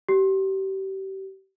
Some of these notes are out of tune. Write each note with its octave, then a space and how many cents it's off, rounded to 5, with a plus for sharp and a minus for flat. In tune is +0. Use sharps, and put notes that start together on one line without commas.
G4 -30